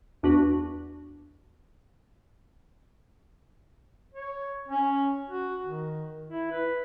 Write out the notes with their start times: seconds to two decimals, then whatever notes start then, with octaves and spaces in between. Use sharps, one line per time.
0.23 E2 D4 F#4 B4
4.14 C#5
4.68 C#4
5.30 F#4
5.64 D#3
6.30 E4
6.52 B4